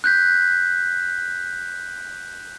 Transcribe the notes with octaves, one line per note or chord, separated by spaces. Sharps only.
F#6 G6 B6